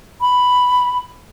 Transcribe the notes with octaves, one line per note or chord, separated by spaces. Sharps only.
B5